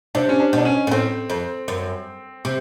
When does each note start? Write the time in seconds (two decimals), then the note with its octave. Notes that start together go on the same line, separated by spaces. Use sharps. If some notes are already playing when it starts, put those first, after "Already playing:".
0.15 C3 D4
0.29 C#4
0.40 D4
0.53 B2 D4
0.65 C#4
0.87 A#2
0.91 A2 C4
1.30 F2
1.68 F#2
2.45 C3